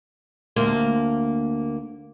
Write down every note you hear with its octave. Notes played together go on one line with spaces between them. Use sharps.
D2 A#3 C5